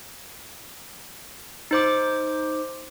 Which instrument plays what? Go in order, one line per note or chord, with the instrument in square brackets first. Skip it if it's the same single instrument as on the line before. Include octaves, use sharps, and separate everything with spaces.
[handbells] D#4 C5 D6